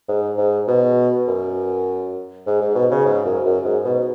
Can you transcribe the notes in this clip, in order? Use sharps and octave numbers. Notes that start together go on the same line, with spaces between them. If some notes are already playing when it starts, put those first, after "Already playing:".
G#2
G#2
B2
F#2
G#2
G#2
B2
C#3
G#2
F#2
F#2
G#2
B2